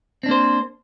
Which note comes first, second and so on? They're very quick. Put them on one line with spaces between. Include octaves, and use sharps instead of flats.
C4 D4 A#3 C5